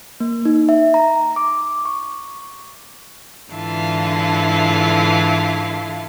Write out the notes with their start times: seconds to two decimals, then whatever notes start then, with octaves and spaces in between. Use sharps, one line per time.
0.20 A#3
0.45 D#4
0.69 E5
0.94 A#5
1.36 D6
1.85 C#6
3.52 G#2 D3 E3 E4 F4 A5